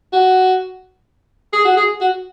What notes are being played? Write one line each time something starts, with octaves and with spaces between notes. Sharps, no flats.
F#4
G#4
F#4
G#4
F#4